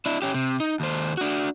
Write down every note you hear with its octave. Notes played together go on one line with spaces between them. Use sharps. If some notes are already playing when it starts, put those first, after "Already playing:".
D4 E4
C#4 G4
C3
D#4
D#2 C5
D4 F#4